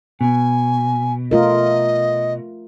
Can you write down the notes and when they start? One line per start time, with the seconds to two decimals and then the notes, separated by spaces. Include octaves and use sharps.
0.21 B2 G#5
1.31 A3 F4 A#4 D#5